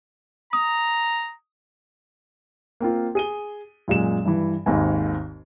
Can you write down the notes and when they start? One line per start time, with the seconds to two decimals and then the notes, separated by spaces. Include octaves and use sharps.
0.53 A#5 D#6
2.80 A#3 C4 F4
3.15 G#4 D#7 G7
3.88 F#2 A#2 G#3 E7
4.25 G2 E3
4.66 G#1 D#2 G#2 G#5